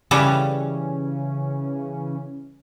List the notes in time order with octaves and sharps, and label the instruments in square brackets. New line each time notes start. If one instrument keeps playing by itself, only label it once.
[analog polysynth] C#3 E3 C#4 [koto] G3 A4 B4